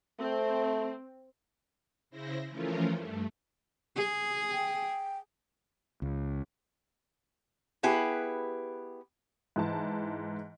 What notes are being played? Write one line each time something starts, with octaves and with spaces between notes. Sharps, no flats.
A3 C4
C#3 E4 C5 A#6
E3 F3 A3 C#4 F4 A#4
G2 A3
G#4
G5
C#2
B3 E4 G4 G#4 B4
G#2 E3 A5